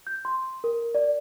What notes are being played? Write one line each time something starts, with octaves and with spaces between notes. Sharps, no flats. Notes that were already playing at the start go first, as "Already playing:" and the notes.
G6
C6
A#4
D5